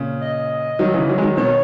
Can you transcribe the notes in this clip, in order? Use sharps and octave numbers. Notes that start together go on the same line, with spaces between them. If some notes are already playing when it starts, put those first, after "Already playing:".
Already playing: A#2 C#3
D#5
D#3 F#3
C#3 E3
D#3 F#3
G#3
D#3 F#3
B2 D#3 C#5